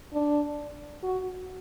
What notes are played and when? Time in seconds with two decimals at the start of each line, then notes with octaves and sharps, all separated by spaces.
0.13 D4
1.03 F#4